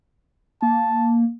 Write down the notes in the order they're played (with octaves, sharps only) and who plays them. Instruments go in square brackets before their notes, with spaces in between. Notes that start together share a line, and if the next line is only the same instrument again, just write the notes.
[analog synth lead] A#3 [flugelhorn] A5